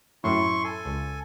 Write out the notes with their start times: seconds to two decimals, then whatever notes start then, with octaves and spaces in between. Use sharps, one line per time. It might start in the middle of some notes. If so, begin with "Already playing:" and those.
0.24 F#2 A2 E4 C6 C#6
0.64 A4 G#5
0.85 C#2